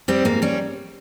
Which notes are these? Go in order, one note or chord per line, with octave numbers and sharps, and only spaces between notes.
G3 C4
G#2 A#3
G3 C#4